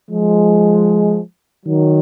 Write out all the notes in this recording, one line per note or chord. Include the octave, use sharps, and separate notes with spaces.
F3 G#3
D#3 F#3